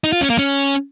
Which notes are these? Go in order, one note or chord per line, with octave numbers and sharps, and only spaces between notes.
D#4
F4
C#4
A#3
C#4